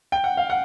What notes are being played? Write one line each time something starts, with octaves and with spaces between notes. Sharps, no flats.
G5
F#5
F5
F#5